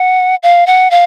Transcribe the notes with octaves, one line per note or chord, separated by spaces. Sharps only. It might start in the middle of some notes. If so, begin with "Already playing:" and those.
Already playing: F#5
F5
F#5
F5